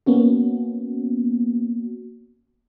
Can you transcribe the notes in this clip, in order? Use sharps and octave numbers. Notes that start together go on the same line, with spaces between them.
A#3 B3 C#4 F#4